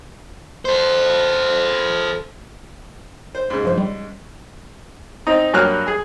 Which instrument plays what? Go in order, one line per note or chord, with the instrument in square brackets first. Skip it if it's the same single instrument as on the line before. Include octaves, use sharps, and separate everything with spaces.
[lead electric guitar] A4 C5
[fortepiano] C5
G#2 C#3
[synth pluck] G2 F3 C5
G3
[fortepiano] C4 D#4
G2 F#3 A#3 F6 F#6
G#4 G#5